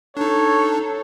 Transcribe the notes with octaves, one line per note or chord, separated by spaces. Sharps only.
D4 D#4 A4 C#5